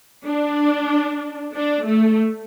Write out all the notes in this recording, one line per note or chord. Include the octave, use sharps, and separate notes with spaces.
D4
D4
A3